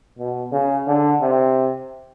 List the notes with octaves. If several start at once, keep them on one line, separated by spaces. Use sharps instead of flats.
B2
C#3
D3
C3